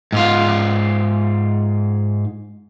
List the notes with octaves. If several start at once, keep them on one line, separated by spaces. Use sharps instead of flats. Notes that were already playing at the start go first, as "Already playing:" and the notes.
G#2 F4